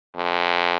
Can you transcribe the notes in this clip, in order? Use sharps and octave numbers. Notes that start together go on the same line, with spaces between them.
F2